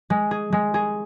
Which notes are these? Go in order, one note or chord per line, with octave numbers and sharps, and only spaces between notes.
G#3
G#4
G#3
G#4